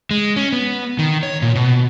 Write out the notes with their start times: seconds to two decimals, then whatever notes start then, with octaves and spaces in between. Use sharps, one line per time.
0.11 G#3
0.36 C#4
0.53 B3
0.99 D#3
1.23 C#5
1.42 A#2
1.55 B2